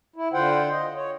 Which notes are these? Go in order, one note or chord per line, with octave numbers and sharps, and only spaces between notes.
E4
D3 F4 C5 F#5 G5
D#5
C#5